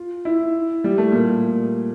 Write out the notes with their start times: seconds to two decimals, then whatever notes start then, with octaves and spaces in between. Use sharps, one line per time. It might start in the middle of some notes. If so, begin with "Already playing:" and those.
Already playing: F4
0.25 E4
0.84 G3
0.98 A3
1.12 A#2